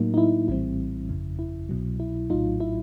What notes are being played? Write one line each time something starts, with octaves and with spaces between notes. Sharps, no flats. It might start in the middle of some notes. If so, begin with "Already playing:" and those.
Already playing: A2 F#3 A#3 D#4
D#4
E4
A#1 A2 E3 G3 C4 E4
G1 F2 C#3
E4
C2 B2 F#3
E4
A#1 A2 F#3 D#4 F4
E4